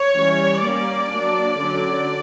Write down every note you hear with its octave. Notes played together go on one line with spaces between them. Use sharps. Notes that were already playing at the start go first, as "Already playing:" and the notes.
Already playing: C#5
E3 G3 C#4
G3 A#3 C#4 D5
F#3 A#3 D4
D3 F#3 C#4